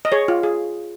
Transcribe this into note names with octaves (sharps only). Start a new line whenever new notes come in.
D#5
G#4 C#5
F4
G#4